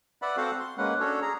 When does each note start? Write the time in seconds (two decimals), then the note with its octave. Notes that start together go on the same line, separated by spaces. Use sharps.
0.22 B4 D5 E5 F#5 B5
0.37 C4 F#4 A4 C5 F5 F#5
0.60 C6
0.78 G#3 A#3 C#4 B4 F#5
1.00 C#4 D4 F#4 A4 C#5
1.22 G#4 A#5